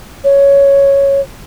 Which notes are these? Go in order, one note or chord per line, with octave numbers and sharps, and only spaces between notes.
C#5